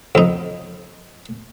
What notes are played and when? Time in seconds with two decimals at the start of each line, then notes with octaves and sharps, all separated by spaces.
0.15 F2 D#4